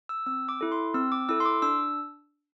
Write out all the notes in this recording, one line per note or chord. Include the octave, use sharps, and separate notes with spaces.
E6
C4 E6
D6
E4 A4
C6
C4 E6
D6
E4 A4 E6
C6
D6
D4 E6